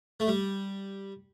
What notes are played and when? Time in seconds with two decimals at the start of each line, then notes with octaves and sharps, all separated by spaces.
0.20 A3
0.27 G3